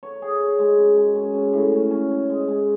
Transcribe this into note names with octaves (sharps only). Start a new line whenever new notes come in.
C#5
G#4
C#5
G#3
F#2
G#3
C#4
C#4
A2
C#4
C#4
C#4
G#3
G#3